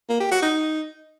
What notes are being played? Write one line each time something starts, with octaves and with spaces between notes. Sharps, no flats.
A#3
G4
F#4
D#4